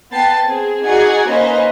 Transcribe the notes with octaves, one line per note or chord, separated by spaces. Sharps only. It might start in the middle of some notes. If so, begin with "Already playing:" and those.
B3 B4 G5 A5 A6 C7
C4 G#4
D#4 F#4 G#4 D5 F#5 G#5
A#3 C#4 D#4 B4 C5 D#5